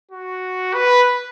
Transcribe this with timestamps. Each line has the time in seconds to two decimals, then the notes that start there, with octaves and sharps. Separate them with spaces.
0.12 F#4
0.74 B4